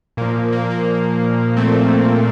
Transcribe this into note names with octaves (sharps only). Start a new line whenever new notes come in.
A#2 F3 A#3
A#3
A#3
A3 C4